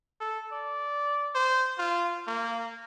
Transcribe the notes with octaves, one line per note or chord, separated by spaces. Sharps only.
A4
D5
C5
F4
A#3